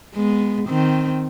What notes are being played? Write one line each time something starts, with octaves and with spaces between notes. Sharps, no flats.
G#3 B3
D#3 C4